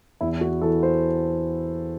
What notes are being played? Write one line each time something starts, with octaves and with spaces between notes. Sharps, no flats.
E2 E4
F#4
E3 A4
C5